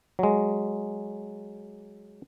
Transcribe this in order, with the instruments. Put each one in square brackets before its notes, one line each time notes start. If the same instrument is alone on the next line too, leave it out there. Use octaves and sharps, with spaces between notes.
[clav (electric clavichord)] F#3 G#3